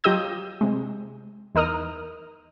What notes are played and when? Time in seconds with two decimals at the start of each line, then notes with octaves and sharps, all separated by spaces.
0.04 F#3 F4 G4 D#5 D#6 G6
0.61 C3 G#3
1.55 E2 D#4 A#4 D#6 F6